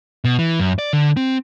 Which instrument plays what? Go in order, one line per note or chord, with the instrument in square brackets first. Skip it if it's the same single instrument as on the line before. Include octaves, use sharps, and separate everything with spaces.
[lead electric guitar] B2
E3
F#2
D5
D3
C4